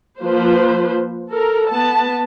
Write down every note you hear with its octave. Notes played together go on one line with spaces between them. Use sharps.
F3 A#3 B4 C5
A4 A#4
B3 A5